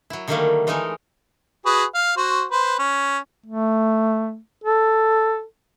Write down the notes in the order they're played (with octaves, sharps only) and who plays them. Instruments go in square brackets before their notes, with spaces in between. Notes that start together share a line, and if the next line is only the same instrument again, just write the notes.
[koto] F#3 E4
D3 D#3 F#3 G3 A3 A#3
E3 G#3 A3 D#4 A#4
[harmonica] F#4 G#4 B4
F5
F#4 C5
B4 C5
C#4
[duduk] A3
A4